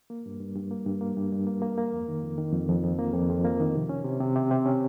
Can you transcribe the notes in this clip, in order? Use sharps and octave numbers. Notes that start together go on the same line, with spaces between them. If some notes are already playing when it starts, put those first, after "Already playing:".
A#3
G2
G2
G2
A#3
G2
A#3
G2
G2
A#3
A#3
A#3
F2
D#3
F2
D#3
F2
F2
F2
A#3
F2
F2
A#3
D#3
C3
C#4
C3
C3
C3
C3
C#4